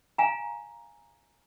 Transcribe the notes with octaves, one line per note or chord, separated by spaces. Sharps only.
F5 G#5 A#5